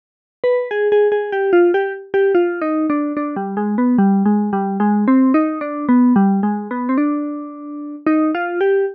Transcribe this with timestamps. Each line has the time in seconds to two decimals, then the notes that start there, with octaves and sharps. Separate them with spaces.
0.44 B4
0.71 G#4
0.92 G#4
1.12 G#4
1.32 G4
1.53 F4
1.74 G4
2.14 G4
2.35 F4
2.62 D#4
2.90 D4
3.17 D4
3.36 G3
3.57 G#3
3.78 B3
3.98 G3
4.26 G#3
4.53 G3
4.80 G#3
5.08 C4
5.34 D#4
5.61 D4
5.89 B3
6.16 G3
6.43 G#3
6.71 B3
6.89 C4
6.98 D4
8.07 D#4
8.35 F4
8.61 G4